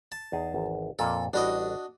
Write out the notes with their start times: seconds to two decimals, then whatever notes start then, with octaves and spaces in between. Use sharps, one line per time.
0.12 A5
0.32 E2 D#4 G#4
0.54 G#1 E2
0.99 F2 A#2 A#3 A4
1.33 A1 G3 D4 F#4 D#5